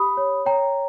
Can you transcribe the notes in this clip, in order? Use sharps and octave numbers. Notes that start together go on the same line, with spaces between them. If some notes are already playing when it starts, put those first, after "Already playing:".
Already playing: G4 B5 D#6
C#5
C#5 G5 A#5